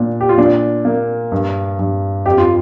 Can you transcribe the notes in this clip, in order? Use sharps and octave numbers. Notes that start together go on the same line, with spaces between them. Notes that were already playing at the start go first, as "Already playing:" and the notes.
Already playing: A#2 D4
G4
F4
A#2 D4
A#3
G2
G2
F2 G4
F4